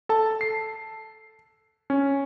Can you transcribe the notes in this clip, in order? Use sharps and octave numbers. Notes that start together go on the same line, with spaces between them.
A4 A5
C7
C#4